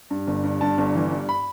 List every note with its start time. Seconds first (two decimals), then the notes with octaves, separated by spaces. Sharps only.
0.11 G2
0.27 G1
0.44 G2
0.61 G2 A5
0.78 G1
0.95 E3
1.11 G2
1.29 B5